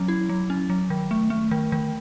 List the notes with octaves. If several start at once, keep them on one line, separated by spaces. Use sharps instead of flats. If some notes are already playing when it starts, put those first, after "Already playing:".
Already playing: F#3 C#4
E4
F#3
C#4
F#3
D#3
A3
A3
D#3
D#3